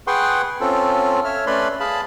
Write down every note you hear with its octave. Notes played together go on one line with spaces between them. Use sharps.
G#4 B4 F#5 G5 C6 C#6
C4 C#4 F4 A4
C#5 E5 F6
A3 C#4 B4 D5 B5 C6
G#4 F5 A5 B5